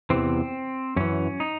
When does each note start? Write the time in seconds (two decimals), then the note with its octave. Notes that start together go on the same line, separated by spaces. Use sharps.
0.10 E2 C3 E3 C4
0.96 F#2 E3 C#4
1.40 D#4